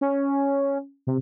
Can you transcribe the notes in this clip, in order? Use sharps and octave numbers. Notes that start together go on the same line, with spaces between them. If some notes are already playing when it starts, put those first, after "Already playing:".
C#4
C3